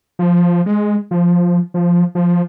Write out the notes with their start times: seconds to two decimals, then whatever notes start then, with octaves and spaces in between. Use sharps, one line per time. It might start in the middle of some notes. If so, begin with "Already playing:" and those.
0.19 F3
0.66 G#3
1.11 F3
1.74 F3
2.15 F3